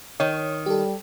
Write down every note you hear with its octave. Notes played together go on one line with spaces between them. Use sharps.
D#3 C#5
G3 G4 A4